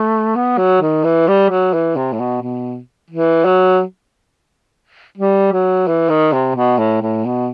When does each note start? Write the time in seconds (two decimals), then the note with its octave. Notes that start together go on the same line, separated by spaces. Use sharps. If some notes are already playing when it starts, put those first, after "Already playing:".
Already playing: A3
0.36 B3
0.58 F#3
0.82 D#3
1.04 E3
1.28 G3
1.50 F#3
1.73 E3
1.96 C3
2.13 A2
2.20 B2
2.42 B2
3.11 E3
3.45 F#3
5.18 G3
5.52 F#3
5.87 E3
6.09 D#3
6.33 C3
6.56 B2
6.78 A2
7.02 A2
7.25 B2